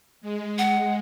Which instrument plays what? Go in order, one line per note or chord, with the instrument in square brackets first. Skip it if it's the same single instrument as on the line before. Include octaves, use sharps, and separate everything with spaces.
[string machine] G#3
[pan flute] F#5